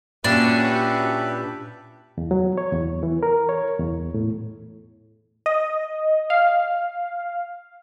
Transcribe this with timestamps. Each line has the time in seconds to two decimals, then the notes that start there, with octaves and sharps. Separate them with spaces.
0.24 A#2 C#4 D4 F#4 G4 B4 E5
2.18 E2
2.31 F#3
2.58 C#5
2.72 E2
3.03 E3
3.23 A#4
3.49 C#5
3.78 E2
4.14 A2
5.46 D#5
6.30 F5